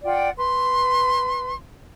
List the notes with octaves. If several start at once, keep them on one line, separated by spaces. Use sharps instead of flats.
F4 D5 F#5 G5
B4 C6